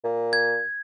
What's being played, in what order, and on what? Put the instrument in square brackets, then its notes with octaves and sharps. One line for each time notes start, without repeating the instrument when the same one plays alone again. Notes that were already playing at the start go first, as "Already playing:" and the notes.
[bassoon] A#2
[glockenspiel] G#6